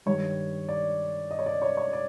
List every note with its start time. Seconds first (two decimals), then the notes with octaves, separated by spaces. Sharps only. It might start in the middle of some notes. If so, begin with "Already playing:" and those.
0.06 G2 D#3 G3 C#5
0.69 D5
1.31 D#5
1.39 C#5
1.46 D5
1.62 C#5
1.77 C#5
1.93 D5